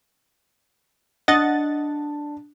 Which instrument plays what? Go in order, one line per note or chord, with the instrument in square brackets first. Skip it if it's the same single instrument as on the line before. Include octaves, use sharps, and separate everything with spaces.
[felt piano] D4 [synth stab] D#5 F#5 A6